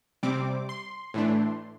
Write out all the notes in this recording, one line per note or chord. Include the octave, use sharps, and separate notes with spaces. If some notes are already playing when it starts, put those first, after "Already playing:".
C3 G3 C4 D6
C6
A2 E3 A3 D4